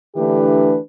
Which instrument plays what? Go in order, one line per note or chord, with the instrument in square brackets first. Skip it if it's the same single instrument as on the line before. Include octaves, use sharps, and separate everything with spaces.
[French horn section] D3 E3 A3 D4 G4 B4